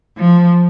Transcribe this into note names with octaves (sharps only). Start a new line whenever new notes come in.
F3